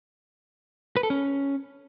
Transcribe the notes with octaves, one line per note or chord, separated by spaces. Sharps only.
B4
A4
C#4